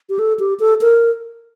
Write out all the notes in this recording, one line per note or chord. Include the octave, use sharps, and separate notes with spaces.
G4
A4
G4
A4
A#4